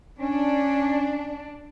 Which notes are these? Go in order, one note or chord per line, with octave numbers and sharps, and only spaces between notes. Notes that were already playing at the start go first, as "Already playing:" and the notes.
C#4 D4